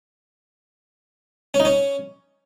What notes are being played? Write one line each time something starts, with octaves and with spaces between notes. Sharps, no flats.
C#4
D#4
C#4